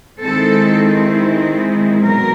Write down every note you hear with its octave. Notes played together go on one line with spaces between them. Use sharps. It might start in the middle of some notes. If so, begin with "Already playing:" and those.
D#3 G#3 C4 E4 A4
B2 F#3 A#4